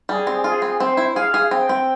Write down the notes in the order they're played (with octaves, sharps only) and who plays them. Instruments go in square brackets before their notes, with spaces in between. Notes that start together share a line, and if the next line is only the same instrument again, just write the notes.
[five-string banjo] G3 [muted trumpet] G#4
[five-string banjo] C4
[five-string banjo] F4 [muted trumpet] G#4
[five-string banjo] C4
[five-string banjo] C4 [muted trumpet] C5
[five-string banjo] E4
[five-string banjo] G#4 [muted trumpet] F5
[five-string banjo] G#4
[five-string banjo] C4 [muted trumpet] G5
[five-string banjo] C4